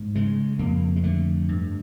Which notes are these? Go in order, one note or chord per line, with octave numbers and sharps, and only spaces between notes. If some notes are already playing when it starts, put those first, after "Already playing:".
Already playing: G#2
C#3 G#3
F2 A#3
G#3
D3 A3
G2